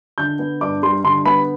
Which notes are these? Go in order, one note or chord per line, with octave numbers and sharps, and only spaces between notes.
D3 G6
B3
G2 D6
G3 C6
D3 C6
B3 B5